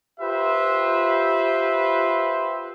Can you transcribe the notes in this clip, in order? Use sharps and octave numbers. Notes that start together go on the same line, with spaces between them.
F4 G4 B4 C5 E5